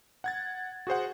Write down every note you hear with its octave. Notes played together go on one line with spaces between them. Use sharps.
F#5 G#6 A6
F#4 G#4 C5 F#5